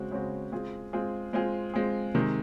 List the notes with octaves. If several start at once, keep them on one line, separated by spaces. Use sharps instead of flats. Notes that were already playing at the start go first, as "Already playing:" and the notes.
Already playing: C#3 G#3 C4 F#4
C#3 G#3 C4 F#4
G#3 C4 F4 G#4
G#3 C4 F4 G#4
G#3 C4 F4 G#4
G#3 C4 F4 G#4
C3 D#3 G#3